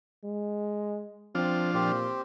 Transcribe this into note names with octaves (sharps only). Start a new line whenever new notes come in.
G#3
F3 C4 D4 F4
A#2 C4 G4